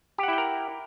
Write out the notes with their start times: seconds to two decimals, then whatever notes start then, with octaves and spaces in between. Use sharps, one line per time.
0.18 G4
0.23 F#5
0.28 E4
0.33 G5
0.38 A#4